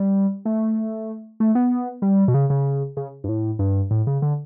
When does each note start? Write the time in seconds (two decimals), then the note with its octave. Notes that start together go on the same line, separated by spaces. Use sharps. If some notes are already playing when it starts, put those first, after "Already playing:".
Already playing: G3
0.45 A3
1.40 A3
1.55 B3
2.02 G3
2.28 B2
2.34 C#3
2.50 C#3
2.97 C#3
3.24 G2
3.29 A2
3.59 G2
3.91 A2
4.07 C#3
4.22 D3